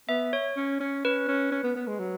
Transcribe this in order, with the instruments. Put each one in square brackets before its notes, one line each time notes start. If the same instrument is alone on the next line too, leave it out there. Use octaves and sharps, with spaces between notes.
[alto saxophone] B3 [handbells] E5
[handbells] C#5
[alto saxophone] C#4
C#4
[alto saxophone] C#4 [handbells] B4
[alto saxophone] C#4
C#4
B3
B3
G#3
F#3